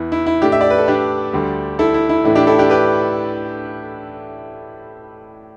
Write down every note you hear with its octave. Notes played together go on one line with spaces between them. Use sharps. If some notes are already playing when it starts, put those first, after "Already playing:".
Already playing: E2 E3 B3 E4
E4
E4
A2 A3 D4 G4
E5
D5
B4
A4
D4 G4
D2 D3 G3
E4 A4
E4
E4
A2 E3 A3 D4 E4
D4 G4
E4 A4
D4 G4
G4 B4